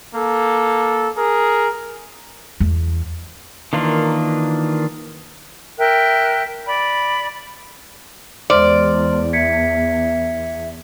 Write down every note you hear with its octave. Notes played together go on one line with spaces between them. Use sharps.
A#3 A4
G#4 A#4
E2
D#3 E3 A#3 D4 F4
A#4 E5 G5 F#6
D5 B5
E2 G#3 C5 D5 C6 F6
E5 G#6 B6 C#7